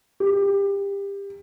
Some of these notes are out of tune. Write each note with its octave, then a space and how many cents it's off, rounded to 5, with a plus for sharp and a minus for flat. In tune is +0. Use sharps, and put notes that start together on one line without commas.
G4 +25